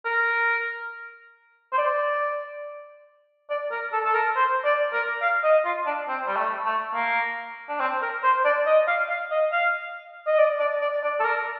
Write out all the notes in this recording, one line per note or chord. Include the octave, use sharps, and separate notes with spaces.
A#4
C5
D5
D5
A#4
A4
A4
A#4
C5
D5
A#4
F5
D#5
F4
D4
C4
G3
A3
A3
A#3
D4
C4
A#4
C5
D5
D#5
F5
F5
D#5
F5
D#5
D5
D5
D5
D5
A4
A#4